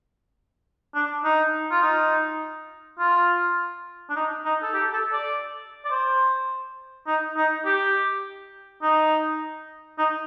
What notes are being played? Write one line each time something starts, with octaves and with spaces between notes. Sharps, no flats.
D4
D#4
F4
D#4
F4
D4
D#4
D#4
A4
G4
A4
D5
D5
C5
D#4
D#4
G4
D#4
D#4